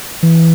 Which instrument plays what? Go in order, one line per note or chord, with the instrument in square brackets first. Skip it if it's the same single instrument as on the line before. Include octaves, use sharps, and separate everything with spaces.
[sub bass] E3